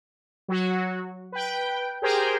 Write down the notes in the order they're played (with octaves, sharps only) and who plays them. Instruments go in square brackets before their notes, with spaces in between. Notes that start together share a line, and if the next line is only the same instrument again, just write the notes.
[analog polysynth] F#3 F#4
B4 G5
G4 G#4 A#4 C5 G5